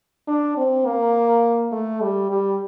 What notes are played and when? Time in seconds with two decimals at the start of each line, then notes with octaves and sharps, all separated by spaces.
0.28 D4
0.57 C4
0.86 A#3
1.72 A3
2.01 G3
2.30 G3